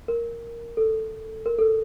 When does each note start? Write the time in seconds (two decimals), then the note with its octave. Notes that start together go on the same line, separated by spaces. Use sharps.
0.08 A#4
0.77 A4
1.46 A#4
1.59 A4